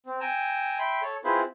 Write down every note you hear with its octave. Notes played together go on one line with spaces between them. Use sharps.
C4
G5 G#5 A#5 E6
E5 G5 B5 C6
A4 C#5
C4 E4 F4 G#4 B4 C5